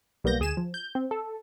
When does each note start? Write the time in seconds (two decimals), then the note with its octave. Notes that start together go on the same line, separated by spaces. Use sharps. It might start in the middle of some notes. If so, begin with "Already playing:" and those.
0.24 B1 G3 A#3 B3 G6 A#6
0.40 D2 G#4 G#5 E7
0.57 F3
0.74 G6
0.95 C4
1.11 A4